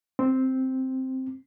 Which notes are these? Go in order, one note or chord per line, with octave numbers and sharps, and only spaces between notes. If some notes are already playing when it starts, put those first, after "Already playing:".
C4